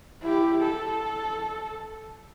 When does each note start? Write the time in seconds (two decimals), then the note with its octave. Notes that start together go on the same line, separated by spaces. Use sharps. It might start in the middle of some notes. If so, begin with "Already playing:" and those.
0.23 E4 G4
0.61 A4